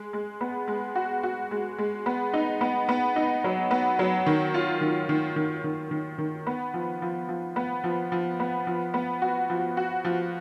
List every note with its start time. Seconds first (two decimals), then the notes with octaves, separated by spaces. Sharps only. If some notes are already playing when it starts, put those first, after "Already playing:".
Already playing: G#3
0.13 G#3
0.41 B3
0.68 G#3
0.95 F#4
1.23 F#4
1.51 G#3
1.79 G#3
2.06 B3
2.33 D#4
2.61 B3
2.89 B3
3.16 D#4
3.44 F#3
3.71 B3
3.99 F#3
4.26 D#3
4.54 F4
4.81 D#3
5.09 D#3
5.36 D#3
5.64 D#3
5.91 D#3
6.18 D#3
6.47 B3
6.74 F3
7.02 F3
7.29 F3
7.56 B3
7.84 F3
8.12 F3
8.40 B3
8.67 F3
8.94 B3
9.22 F#4
9.50 F3
9.77 F#4
10.04 F3